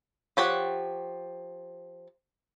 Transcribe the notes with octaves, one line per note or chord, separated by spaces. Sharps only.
F3 G4 C#5 F#5